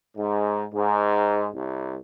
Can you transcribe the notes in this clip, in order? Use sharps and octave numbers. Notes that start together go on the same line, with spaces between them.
G#2
G#2
C2